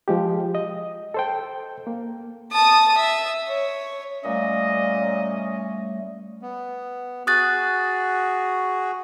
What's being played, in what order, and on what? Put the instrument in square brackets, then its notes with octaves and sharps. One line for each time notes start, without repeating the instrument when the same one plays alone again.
[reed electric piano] F3 G#3 G4
D#5
A4 C5 G5
A#3
[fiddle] A5 D#6
E5
C#5
[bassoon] A#2 [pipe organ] G3 A3 [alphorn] C#4 [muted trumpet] D#5
[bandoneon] B3
[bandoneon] F#4 G#4 [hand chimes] D#6 F#6 A6